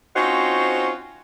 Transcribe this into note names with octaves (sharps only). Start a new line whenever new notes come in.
C4 C#4 D#4 F4 F#4 C5